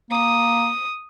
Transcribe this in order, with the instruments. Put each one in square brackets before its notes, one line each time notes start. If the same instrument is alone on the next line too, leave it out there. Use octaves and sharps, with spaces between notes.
[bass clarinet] A#3 [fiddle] D#6